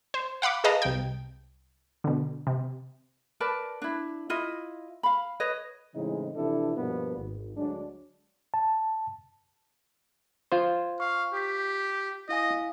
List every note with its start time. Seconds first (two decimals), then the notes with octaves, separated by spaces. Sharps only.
0.14 C5
0.42 F5 F#5 B5 D6
0.64 G#4 B4 D#5 F5 A5 A#5
0.82 C2 G5
2.04 B2 D3
2.47 C3
3.40 A#4 B4 D5 A5
3.82 D4 E4
4.30 E4 F4 D#5 E5
5.03 F5 B5
5.40 B4 C#5 D#5
5.95 A2 C#3 E3 G#3 C4 D#4
6.36 C3 E3 F3 D4 E4 A4
6.77 G2 B2 F3 A#3 B3 D4
7.17 G#1
7.56 D2 F#3 G#3 D4
8.54 A5
10.52 F4 C5 G#6
11.00 F5 C#6
11.34 G4 G6 B6
12.29 E4 D#5 F5 G#5